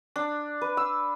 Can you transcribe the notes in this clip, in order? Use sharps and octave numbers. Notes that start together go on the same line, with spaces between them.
D4
B4
E6